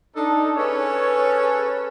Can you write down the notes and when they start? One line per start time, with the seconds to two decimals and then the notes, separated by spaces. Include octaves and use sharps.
0.15 D4 D#4 A4
0.57 C#4 G#4 A4 B4 C#5